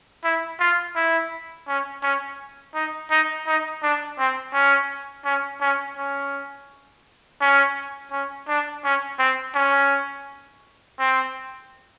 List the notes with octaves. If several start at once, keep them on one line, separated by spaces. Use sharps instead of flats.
E4
F4
E4
C#4
C#4
D#4
D#4
D#4
D4
C4
C#4
C#4
C#4
C#4
C#4
C#4
D4
C#4
C4
C#4
C4